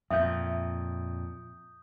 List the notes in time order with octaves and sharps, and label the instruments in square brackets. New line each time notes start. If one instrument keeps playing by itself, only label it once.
[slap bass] F2 A#2 [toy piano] E5 [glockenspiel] D#6 G6